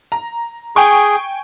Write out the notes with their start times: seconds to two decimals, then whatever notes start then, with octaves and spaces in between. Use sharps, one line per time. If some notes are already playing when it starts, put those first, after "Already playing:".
0.12 A#5
0.76 G#4 G5 G#5 C#6